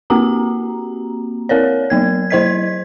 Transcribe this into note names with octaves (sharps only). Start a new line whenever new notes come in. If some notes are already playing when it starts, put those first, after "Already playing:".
A#3 C4 F#4 G4 A#5
C4 A#4 C#5 D5
F#3 B3 G#6
F#3 E4 C5 D#5 G#6 B6